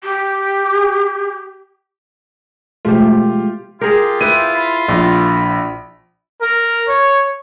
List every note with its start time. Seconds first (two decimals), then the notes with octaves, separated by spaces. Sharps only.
0.03 G4
2.85 B2 F3 G#3 A3 F4 G4
3.81 F4 G4 G#4 A#4
4.21 E4 B4 D#7
4.55 B5
4.88 A#1 B5
6.40 A#4
6.87 C#5